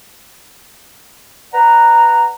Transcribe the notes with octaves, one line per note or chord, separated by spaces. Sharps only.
B4 D5 F#5 A#5